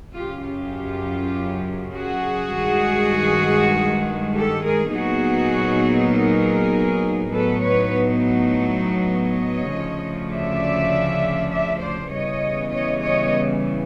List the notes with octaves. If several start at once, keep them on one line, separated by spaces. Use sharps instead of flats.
F#2 C#3 F#3 F4 G4
F4 G4
F#4 G#4
G2 D#3 G#3
G4 A4
G#4 A#4
A#2 F#3 B3 D#4 F#4 G#4
G#4 A#4
A2 F#3 B3 D#4 A4 B4
B4 C#5
C#5 D#5
D2 C#3 F3
D5 E5
D5 E5
C5 D5
C#3 E3 G3 B3 C#5 D#5
C#5 D#5
C#5 D#5